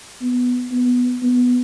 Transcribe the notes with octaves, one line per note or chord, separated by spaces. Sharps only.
B3
B3
B3